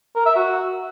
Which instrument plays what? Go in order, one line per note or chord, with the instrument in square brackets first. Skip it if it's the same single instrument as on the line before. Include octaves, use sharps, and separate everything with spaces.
[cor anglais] A#4
E5
F#4